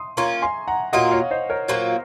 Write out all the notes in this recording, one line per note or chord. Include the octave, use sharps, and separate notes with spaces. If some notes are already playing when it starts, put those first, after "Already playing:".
Already playing: C6 D#6
A#3 C#4 F4 A#5 C#6
G#5 C6
F#5 A#5
A#2 F#3 A#3 F4 D#5 F#5
C#5 F5
C5 D#5
A#4 C#5
A#2 F#3 A#3 F4 C5